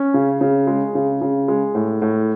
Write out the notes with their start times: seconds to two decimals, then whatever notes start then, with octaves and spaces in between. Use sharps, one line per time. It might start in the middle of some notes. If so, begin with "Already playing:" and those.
Already playing: C#4
0.14 C#3
0.41 C#3
0.67 G#3
0.95 C#3
1.22 C#3
1.48 G#3
1.75 A2
2.02 A2